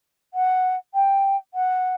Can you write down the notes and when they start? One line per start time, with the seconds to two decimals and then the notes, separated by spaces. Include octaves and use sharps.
0.34 F#5
0.94 G5
1.54 F#5